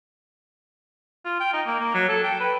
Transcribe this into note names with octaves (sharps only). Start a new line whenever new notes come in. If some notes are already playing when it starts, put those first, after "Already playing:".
F4
G5
D#4
A#3
A#3
F#3
A4
G5
B4